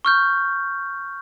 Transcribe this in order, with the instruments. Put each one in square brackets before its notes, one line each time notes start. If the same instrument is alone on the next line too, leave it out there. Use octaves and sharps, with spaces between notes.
[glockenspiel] C#6 F6 G6